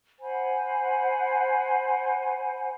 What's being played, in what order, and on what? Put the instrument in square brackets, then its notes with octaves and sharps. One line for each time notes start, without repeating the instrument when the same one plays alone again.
[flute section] C5 F#5 G#5 B5